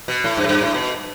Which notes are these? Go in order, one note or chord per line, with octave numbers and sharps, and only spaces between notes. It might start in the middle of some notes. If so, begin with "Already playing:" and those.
B2
A2
G2
A2
G2
A2
B2